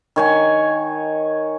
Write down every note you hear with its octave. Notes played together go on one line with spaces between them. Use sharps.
D#3 C#5 G#5